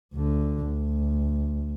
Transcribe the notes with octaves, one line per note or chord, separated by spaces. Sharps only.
D2 D3
D2